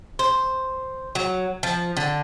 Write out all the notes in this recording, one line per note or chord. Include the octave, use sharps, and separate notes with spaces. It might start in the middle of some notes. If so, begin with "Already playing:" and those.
C5
F#3
F3
D3